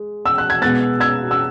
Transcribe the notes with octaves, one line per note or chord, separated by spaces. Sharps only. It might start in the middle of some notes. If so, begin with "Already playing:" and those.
Already playing: G#3
E6
F#6
G#6
B2 G#3 B3 F#6 A6
E6 G#6
E6